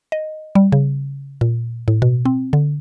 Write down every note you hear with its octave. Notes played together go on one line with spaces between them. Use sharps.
D#5
G3
C#3
A#2
A2
B2
C4
D3